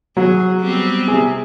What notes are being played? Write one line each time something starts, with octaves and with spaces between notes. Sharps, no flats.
F#3 G#4
G3 B3 C4
C3 G#4